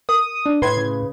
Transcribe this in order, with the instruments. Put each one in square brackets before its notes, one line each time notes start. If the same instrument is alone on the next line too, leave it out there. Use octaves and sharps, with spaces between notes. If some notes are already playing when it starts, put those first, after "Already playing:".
[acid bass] A#4 [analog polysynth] D#6
[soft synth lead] D4
[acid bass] A2 [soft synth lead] B4 [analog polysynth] C6 G#6
[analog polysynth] C#3